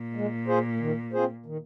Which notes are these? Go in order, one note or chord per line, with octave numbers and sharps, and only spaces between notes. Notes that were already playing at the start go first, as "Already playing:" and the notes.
Already playing: A#2
G#3
F4 G#4 C5
D#3
C4 F4 G#4 C5
D#3